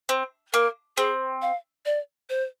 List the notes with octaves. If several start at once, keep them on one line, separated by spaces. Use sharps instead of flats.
C4
A#3 A#4
C4 G#4
F5
D5
C5